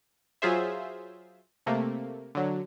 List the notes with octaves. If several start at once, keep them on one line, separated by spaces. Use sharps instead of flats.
F#3 F4 G#4 C5 E5
C3 A3 A#3
D3 F#3